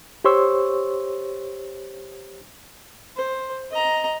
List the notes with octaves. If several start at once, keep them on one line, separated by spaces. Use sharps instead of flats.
G4 C5 C#5 C6 C#6 E6
C5
D#5 A#5